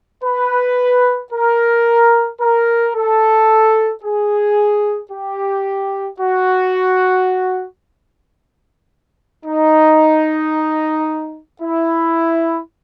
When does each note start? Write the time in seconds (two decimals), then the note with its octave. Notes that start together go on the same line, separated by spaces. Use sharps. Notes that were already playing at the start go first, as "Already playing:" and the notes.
0.24 B4
1.32 A#4
2.41 A#4
2.95 A4
4.04 G#4
5.12 G4
6.20 F#4
9.45 D#4
11.62 E4